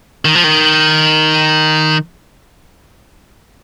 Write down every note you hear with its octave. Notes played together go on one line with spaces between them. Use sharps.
D#3
F3
D#3